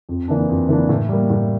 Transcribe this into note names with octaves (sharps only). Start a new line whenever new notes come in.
F2
E3 A#3 D4
F2
E3 A#3 D4
A2
G3 A#3
A2